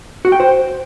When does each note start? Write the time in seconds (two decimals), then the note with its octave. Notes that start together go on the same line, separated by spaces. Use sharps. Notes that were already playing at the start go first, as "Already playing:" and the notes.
0.25 F#4
0.32 G5
0.40 C5